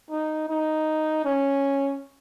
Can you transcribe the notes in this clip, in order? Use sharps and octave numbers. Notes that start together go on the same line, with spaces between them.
D#4
D#4
C#4